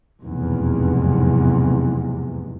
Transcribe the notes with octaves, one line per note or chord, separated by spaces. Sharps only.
F1 B1 E2 G#2 C3